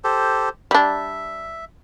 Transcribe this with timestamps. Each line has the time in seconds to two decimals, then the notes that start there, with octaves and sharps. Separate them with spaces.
0.04 G4 A4 C5
0.71 G3 D4 E5